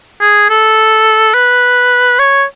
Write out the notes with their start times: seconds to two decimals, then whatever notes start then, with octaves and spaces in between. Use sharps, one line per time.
0.21 G#4
0.50 A4
1.34 B4
2.19 C#5